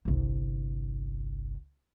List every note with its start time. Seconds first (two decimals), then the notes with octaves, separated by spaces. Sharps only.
0.05 G1 C2